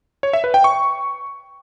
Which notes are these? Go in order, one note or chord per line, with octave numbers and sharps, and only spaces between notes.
C#5
E5
B4
G5
C#6